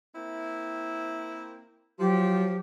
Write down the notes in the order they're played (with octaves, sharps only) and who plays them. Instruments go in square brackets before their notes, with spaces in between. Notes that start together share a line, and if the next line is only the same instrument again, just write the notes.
[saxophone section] A#3 C4 E4
[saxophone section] F3 [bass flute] F#3 [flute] G4